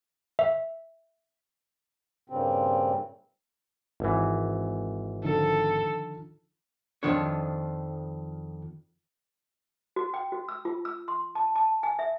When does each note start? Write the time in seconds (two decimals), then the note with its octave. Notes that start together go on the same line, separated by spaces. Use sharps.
0.39 E5
2.30 G2 A#2 C#3 C4
4.00 G#1 E3
5.24 D3 D#3 F3 A4
7.03 F2 D#3 F3 D4 C#5
9.96 F#4
10.14 G5
10.32 F#4
10.48 E6
10.65 F4
10.85 E6
11.08 C6
11.35 A5
11.56 A5
11.83 G#5
11.99 E5